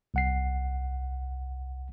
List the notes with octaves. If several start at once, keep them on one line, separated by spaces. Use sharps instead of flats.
C2 F#5 C7